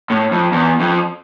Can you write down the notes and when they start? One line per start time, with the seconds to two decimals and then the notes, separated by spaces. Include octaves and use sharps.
0.10 A2
0.31 F2
0.52 E2
0.80 F2